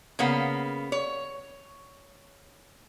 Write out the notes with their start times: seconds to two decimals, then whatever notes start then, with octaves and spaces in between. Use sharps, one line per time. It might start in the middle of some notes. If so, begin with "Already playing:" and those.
0.19 C#3 A#3 B3
0.92 C#5